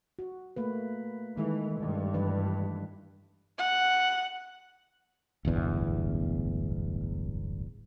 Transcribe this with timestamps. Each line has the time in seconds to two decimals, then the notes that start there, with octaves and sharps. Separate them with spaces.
0.19 F#4
0.56 A3 A#3 B4
1.37 D#3 E3 G#3 A4
1.80 G2
2.14 E3 D4 B4
3.59 F#5
5.45 D1 G1 E2